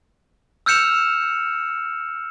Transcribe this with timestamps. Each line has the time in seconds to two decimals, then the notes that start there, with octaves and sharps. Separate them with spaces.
0.66 E6 F6 G6 C#7 E7 F7